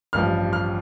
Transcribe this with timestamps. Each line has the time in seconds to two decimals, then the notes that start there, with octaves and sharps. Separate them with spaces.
0.13 A1 G2 F3 F6
0.53 F6